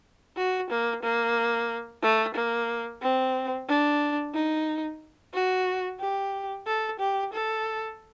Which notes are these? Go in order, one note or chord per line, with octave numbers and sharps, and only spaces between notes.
F#4
A#3
A#3
A3
A#3
C4
D4
D#4
F#4
G4
A4
G4
A4